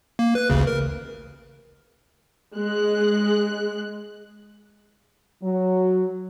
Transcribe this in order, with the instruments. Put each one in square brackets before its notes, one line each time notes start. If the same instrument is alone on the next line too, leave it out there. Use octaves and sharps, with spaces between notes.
[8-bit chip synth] A#3
B4 F#6
A1 D2 C#3
A#4
[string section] G#3 F#6
[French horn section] F#3